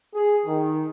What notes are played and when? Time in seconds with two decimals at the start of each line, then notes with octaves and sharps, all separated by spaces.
0.15 G#4
0.46 D#3